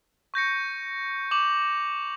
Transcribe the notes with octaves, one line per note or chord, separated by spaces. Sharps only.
C#6 G6 A#6 C#7
D6 F7 F#7